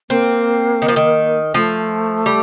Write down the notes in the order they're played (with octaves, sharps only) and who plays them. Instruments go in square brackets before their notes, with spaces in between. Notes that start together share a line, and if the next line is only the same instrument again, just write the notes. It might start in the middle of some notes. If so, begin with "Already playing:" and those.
[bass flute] A#3 [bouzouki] C4
[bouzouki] D#3
F3
D#3
[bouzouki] F3 [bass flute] A3
[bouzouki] G3